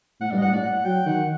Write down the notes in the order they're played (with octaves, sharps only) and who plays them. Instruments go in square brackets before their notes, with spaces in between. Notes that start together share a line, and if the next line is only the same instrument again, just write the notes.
[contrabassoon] A2 [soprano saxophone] F#5
[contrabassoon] G2 [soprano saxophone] D5
[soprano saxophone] D#5
[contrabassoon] G2 [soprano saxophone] F#5
[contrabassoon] A2 [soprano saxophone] D5
[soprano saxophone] F#5
[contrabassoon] F#3 [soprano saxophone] G5
[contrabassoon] D#3 [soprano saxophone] F#5